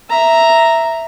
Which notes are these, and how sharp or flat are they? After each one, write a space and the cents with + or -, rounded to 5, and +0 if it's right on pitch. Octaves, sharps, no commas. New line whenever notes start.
E5 +0 A#5 +0